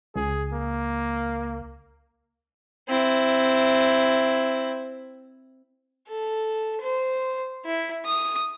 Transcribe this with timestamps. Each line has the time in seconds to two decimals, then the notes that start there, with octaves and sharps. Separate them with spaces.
0.16 C#2 G#4
0.53 A#3
2.88 C4 E4
6.08 A4
6.81 C5
7.65 E4
8.05 D#6